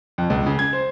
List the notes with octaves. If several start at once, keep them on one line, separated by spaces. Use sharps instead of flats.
F2
C#2
C#3
G#6
C5